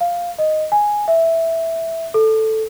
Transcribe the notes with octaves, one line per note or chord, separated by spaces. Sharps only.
F5
D#5
G#5
E5
A4